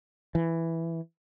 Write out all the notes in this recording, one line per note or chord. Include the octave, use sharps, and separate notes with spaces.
E3